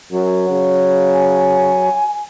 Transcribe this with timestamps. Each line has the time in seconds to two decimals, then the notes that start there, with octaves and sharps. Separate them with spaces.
0.12 F#2 F#3
0.50 C#3
1.15 G#5